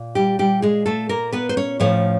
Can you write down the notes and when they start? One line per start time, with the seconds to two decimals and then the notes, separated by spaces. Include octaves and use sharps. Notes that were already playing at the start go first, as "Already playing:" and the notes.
Already playing: A#2
0.15 G3 G4
0.39 G3 G4
0.62 G#3 G#4
0.86 A3 A4
1.09 A#3 A#4
1.33 B3 B4
1.49 C5
1.57 C#4 C#5
1.80 A2 F3 C#4 C#5